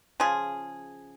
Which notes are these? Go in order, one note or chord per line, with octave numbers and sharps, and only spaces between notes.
C#3 F3 F4 G#4